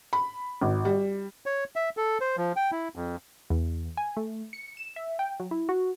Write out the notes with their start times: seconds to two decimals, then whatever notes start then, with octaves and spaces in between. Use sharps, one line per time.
0.13 B5
0.61 G#1
0.85 G3
1.46 C#5
1.76 E5
1.97 A4
2.21 C5
2.37 F3
2.56 G5
2.72 E4
2.96 F2
3.50 E2
3.97 G#5
4.17 A3
4.53 C#7
4.77 E7
4.96 E5
5.19 G5
5.40 F#3
5.51 E4
5.69 F#4